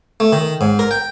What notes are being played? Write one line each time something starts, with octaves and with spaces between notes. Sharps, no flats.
A3
D#3
G#2
A#4
G5